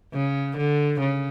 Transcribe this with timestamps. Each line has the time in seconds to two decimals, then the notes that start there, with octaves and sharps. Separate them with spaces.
0.13 C#3
0.57 D3
1.00 C#3